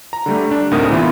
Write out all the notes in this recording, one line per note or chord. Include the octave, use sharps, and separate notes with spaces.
A#5
D3 G3 A3
D4
D2 A2 C3 D#4 A#4 D#6
A#2 E3 B3 E4 F4